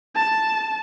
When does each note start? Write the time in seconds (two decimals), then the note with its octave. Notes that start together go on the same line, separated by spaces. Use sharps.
0.16 A5